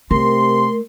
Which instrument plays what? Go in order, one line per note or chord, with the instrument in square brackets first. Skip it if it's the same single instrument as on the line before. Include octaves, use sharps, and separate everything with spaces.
[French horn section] C3 [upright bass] A3 [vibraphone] A#4 [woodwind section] C6